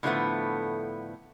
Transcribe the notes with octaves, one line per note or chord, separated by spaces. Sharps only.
A2 D3 F3 G#3 A3 B3